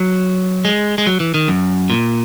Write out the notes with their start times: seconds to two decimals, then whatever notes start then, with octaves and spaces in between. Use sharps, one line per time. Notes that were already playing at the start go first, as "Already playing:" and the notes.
Already playing: F#3
0.65 G#3
0.98 G#3
1.07 F#3
1.20 E3
1.34 D#3
1.48 F#2
1.90 A#2